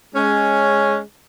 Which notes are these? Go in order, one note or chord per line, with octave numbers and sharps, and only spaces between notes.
G#3 C#4